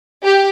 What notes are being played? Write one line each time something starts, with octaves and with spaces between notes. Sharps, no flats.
G4